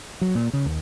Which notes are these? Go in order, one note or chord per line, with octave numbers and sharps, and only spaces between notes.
F#3
A#2
C#3
D#2